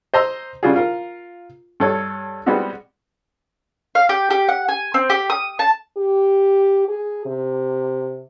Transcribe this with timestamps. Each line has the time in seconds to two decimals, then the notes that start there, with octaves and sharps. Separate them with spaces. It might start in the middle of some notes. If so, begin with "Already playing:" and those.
0.14 C5 D#5 A#5 E6
0.63 C#3 G3 D4 F4 F#4 G#4
0.76 F4 A#4
1.80 G2 A4 C#5
2.46 G3 G#3 B3 C4 F#4 G4
3.95 F5
4.09 G4
4.30 G4
4.49 F#5
4.68 G#5
4.94 C4
5.10 G4
5.30 D#6
5.59 A5
5.97 G4
6.88 G#4
7.26 C3